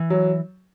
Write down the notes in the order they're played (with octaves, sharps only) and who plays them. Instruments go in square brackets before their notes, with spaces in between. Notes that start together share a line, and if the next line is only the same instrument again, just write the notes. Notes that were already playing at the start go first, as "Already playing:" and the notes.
Already playing: [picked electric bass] E3
[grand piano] F#3